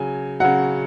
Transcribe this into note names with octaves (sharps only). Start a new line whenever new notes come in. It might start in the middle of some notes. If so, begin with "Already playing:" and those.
Already playing: C#3 F#3 G#5
C#3 F#3 F#5